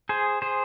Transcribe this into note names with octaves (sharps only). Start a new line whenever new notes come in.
G#4 C5
G#4 C5